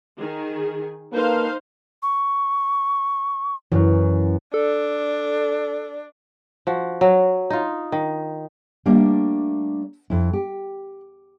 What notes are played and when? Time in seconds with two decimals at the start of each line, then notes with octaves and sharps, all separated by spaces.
0.18 D#3 G#4
1.13 A#3 D#4 A4 B4 C5 F5
2.03 C#6
3.72 F#2 E3 F#3
4.54 D4 A4
6.67 F3 F#4
7.01 F#3
7.50 D#4 F4
7.92 D#3
8.86 G3 A3 A#3 D4
10.10 F2 E4
10.33 G4